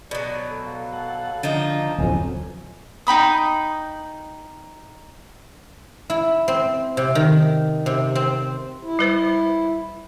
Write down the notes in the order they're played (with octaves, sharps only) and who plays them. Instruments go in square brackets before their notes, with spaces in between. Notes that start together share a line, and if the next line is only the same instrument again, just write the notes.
[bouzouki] B2 F#3 [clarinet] D5
[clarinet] A4
F5
[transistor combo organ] A4 F#5
[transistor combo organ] D3 [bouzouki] F3 A#3 D#4 [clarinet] D4
[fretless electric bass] D1 F2 [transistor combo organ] C#3 F#3 B3 [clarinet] G#5
[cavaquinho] D#4 G5 B5 D#6
[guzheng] E4
C4
C3
D#3
C3
C4
[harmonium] E4
[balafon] G3 B4 C5